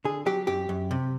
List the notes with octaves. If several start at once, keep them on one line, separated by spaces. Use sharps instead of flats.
D3 G#4
F#3 G4
F#2 G4
F#2
C3